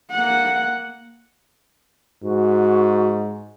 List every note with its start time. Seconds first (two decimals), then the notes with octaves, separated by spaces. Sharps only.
0.12 A#3 F#5
2.23 G#2 F#4